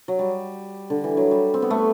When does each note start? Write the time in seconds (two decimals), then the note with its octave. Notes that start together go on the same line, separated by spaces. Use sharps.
0.08 F#3
0.19 G3
0.90 D3
1.04 E3
1.17 F#3
1.31 G3
1.54 C4
1.62 B3
1.70 A3